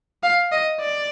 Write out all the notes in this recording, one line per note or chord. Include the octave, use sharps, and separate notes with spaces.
F5
D#5
D5